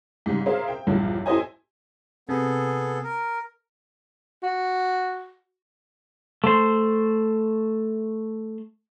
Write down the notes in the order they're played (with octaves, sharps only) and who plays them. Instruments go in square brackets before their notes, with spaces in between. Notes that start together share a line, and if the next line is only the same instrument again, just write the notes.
[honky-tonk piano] G#2 C#3 G3
G#4 A#4 C5 E5 F5
G5
A#1 E2 G2 F3 F#3
E4 G4 A4 C5 D#5 G#5
[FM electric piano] C3 [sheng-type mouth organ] B3 G#4 A4
[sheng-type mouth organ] A#4
[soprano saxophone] F#4
[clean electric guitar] A3 C5